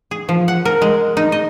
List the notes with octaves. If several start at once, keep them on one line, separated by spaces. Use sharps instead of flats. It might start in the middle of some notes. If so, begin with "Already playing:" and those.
G#4
F3
F#5
A#4
G#3
D#4
D#5